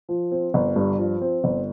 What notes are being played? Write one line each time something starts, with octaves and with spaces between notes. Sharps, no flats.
F3
C4
G1
G2
F3
C4
G1